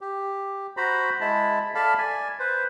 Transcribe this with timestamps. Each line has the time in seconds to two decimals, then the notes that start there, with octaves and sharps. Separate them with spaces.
0.01 G4
0.77 F#4 C5 A#5 B5
1.21 G#3 E4 A5 B5
1.75 A4 D5 E5 F5 A5 B5
1.98 D5 G#5
2.39 B4 C5